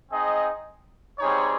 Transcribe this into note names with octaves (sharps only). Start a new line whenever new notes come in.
C4 D#4 G#4 D#5
G3 C4 D#4 G#4 C#5